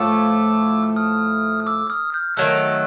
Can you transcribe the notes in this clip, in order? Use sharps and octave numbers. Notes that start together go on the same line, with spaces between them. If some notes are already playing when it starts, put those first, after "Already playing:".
Already playing: A2 F3 A3 D6 E6
D#6 F6
D6 E6
D#6 F6
F6 G6
D#3 F#3 A3 E6 F#6